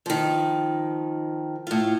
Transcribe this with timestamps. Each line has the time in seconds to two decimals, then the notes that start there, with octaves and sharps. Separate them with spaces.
0.06 D#3 F3
1.67 A2 F4